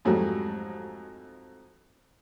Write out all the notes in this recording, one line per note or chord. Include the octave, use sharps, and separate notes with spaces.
F2 G#2 F#3 G3 A3